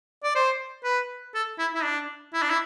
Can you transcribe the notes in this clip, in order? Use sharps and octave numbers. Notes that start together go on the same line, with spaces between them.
D5
C5
B4
A4
E4
E4
D4
E4
D4
E4